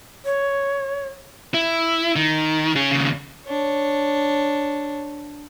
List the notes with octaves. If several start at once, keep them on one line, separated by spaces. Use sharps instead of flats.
C#5
E4
D#3
C#4 G#4
D#2 C#3
D4 C#5